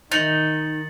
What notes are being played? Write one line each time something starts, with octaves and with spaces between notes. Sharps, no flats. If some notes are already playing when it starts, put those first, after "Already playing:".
D#3 D#4 A6 C#7 F#7